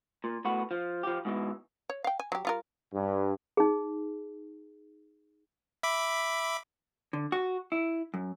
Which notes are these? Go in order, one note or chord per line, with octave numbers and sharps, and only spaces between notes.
A#2
A2 B3 F#4
F3
F3 G4
G#2 B2 E3
C#5
F5 G5
G#5
F#3 G4
G3 F4 A#4
G2
D#4 G#4
E5 B5 D6
D3
F#4
E4
F#2